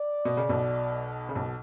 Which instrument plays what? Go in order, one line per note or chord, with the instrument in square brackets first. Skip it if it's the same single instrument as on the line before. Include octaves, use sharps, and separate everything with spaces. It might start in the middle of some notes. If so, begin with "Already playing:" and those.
Already playing: [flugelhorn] D5
[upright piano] B2
C#3
B1 B2
C#3
B1 B2